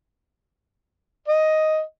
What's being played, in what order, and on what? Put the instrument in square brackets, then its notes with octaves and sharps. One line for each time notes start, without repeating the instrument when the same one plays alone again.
[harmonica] D#5